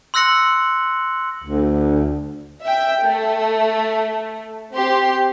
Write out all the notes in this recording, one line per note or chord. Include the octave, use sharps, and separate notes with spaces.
C6 E6 F#6 A#6 C#7 F#7
D2
E5 G5
A3
C4 G4 C6